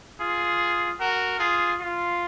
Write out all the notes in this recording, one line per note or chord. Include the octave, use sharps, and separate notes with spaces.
F4 G#4
F#4 A#4
F4 G#4
F4